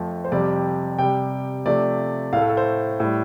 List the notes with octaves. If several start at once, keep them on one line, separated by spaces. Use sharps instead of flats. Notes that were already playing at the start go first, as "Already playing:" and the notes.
Already playing: F2 F3 A3
C5
F2 C3 G3 D5
C3 G3 G5
C3 F3 A3 D5
A2 A3 A4 F5
A4
C5
A2 G3